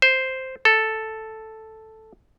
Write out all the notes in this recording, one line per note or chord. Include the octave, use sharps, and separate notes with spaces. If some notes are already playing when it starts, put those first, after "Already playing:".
C5
A4